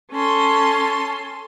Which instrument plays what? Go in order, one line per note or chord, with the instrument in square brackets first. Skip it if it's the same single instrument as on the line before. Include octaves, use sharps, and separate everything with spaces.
[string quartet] C#4 A4 C6